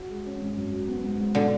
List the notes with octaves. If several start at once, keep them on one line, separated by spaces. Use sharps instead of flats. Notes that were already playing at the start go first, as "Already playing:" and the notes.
Already playing: F#4
G#3
C#4
G#1
F#2
F#3
B3
G#2
G#2
B2 D3